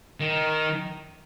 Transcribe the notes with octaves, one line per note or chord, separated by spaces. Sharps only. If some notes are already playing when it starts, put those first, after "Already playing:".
D#3